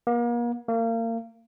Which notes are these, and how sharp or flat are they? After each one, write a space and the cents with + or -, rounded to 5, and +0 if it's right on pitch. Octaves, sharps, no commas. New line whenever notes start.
A#3 +40
A#3 -30